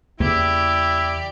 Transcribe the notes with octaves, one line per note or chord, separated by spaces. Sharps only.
E2 C#3 A#3 E4 G4 D5